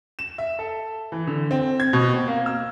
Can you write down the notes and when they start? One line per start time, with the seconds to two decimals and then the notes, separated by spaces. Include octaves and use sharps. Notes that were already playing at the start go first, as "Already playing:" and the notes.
0.19 E7
0.38 E5
0.59 A4
1.12 E3
1.27 D3
1.51 C4
1.80 G#6
1.93 B2
2.14 C4
2.28 A#3
2.46 E6